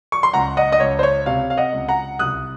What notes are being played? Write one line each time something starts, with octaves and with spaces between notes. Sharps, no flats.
C#6
C6
C#2 F#5 A#5
D#5 F#5
D#5
C#2 C#5
C5
C#5
C3 C#5 F5
F5
D#5 F#5
C#2
F#5 A#5
C2 D#6 F#6